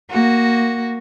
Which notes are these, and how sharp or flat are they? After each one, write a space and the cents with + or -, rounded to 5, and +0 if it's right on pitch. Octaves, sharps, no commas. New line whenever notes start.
A#3 +0 F#4 +0